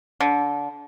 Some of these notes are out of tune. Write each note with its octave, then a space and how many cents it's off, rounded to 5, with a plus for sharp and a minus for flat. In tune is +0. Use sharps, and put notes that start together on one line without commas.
D3 -25